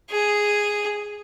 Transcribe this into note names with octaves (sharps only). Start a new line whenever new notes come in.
G#4